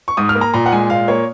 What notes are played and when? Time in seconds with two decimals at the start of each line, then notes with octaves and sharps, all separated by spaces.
0.08 C#6
0.17 G#2 D#6
0.29 F6
0.35 A#3
0.41 A#5
0.54 A#2 A#5
0.66 F#5
0.72 G#3 G#5
0.90 A#2 F5
1.08 A#3 C#5